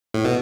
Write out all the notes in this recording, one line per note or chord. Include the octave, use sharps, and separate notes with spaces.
A2
B2